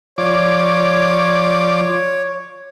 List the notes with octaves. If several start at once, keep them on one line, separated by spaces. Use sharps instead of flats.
F3 C#5 D5 D6